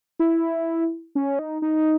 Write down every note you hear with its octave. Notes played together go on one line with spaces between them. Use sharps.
E4
C#4
D#4
D#4